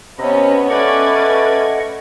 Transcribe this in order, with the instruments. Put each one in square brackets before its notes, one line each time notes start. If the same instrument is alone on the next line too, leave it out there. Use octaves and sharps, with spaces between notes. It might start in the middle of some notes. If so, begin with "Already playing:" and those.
[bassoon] C3 [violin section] B3 C#4 B4 [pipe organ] D#5
[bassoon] A3 [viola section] C#4 B4 D5 [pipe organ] D#5 F#5 [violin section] G#6